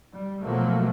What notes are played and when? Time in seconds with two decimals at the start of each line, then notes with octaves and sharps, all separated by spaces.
0.12 G3
0.41 B2 F3 F#3 A3 A#3